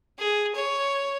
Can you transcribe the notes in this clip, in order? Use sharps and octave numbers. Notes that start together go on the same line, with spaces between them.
G#4
C#5